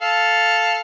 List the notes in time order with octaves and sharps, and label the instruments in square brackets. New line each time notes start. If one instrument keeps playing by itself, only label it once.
[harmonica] A4 F5